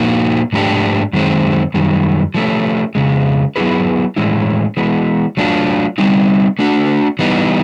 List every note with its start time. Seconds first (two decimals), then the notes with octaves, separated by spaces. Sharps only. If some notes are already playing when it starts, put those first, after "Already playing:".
Already playing: A#2 F3 A#3 D#4 F#4
0.53 G#2 F3 A3 D4 G4
1.13 F#2 D#3 G#3 C4
1.74 F#2 D#3 G3
2.34 F3 A3 C#4
2.95 F2 C#3 G#3
3.56 F#3 B3 E4 G#4 B4
4.16 A2 E3 G#3 C#4 E4
4.77 E3 G#3 B3
5.37 F#3 A3 D4 F4
5.98 G3 C4 D#4
6.59 A3 D4 F#4
7.19 E3 G3 B3 D#4